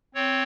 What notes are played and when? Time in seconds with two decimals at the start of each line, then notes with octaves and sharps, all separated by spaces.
0.15 C4 C#5